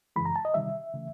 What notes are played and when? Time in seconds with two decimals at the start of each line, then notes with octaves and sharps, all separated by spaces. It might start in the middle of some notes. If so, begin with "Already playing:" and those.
0.16 F#2 C#3 E3 G#3 B5
0.25 A#5
0.36 A5
0.45 D#5
0.54 C3 D#3 G3 E5
0.94 C#3 E3 A3